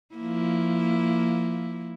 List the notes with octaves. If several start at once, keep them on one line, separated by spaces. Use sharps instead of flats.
F3 A#3 E4